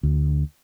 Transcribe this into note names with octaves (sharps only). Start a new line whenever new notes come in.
D2